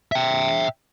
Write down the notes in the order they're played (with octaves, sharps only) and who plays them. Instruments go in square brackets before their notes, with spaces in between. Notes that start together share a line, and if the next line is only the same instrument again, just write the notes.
[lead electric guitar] E5 G5